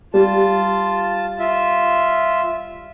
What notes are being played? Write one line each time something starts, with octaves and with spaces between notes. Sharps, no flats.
G3 F4 A5
F4 E5